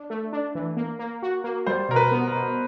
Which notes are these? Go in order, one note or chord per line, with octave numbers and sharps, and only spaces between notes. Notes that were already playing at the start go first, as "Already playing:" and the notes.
Already playing: D4
A3
D4
E3
A#3
A#3
F#4
A#3
G3 C5
B2 A#4
B4
B3
A#4
B2